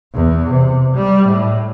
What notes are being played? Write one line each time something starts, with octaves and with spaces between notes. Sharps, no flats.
E2
C3
G3
A2